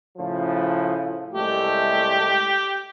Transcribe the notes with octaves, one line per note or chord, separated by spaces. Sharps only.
A2 C#3 F3
C2 G#3 A3 G4